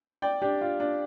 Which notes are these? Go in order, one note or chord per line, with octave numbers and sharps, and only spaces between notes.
D5 G5
D4 G4
F4
D4